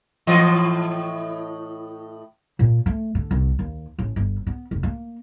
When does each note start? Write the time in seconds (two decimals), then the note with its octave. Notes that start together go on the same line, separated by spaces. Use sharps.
0.27 A2 E3 D#5
2.59 A#2
2.86 A3
3.15 D3
3.31 C2
3.59 D#2
3.99 A1
4.16 G1
4.47 B3
4.71 F1
4.83 A#3